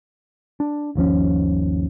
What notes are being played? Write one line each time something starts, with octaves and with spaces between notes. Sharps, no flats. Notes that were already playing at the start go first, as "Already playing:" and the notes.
D4
G1 D#2 F3 C#4